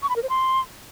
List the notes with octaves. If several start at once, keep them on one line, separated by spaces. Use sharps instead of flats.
C#6
B5
A#4
C5
C6